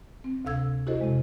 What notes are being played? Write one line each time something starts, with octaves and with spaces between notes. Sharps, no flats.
C4
D2 C3 A4 F5 E6 G#6
E4 F#4 G4 A4 C5 D#5
F2 C3 G#3